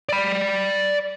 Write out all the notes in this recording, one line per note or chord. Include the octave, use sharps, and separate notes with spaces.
D5 B5